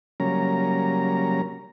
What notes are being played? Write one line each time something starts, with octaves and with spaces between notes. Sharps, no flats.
C#3 F#3 G3 A#3 C#4 A#5